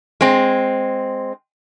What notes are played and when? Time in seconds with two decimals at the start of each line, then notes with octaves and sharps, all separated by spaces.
0.21 G#3 C4